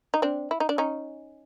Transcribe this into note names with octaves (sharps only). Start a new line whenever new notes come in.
D#4
C4 D4
E4
D#4
D4
C#4 D#4